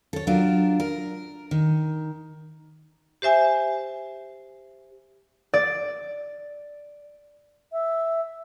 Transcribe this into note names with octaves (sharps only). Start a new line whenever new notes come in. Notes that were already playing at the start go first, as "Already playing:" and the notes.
A4 C#5
F#3 D4 F4 A#4
A#4
D#3
G4 C5 E5 G#5
D5
E5